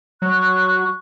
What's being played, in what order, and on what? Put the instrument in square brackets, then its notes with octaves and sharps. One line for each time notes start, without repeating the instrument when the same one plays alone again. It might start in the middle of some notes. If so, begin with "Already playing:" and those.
[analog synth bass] F#3 [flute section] C#6 F#6